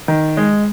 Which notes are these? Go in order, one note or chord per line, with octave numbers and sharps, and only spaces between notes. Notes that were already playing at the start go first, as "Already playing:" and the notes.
D#3
G#3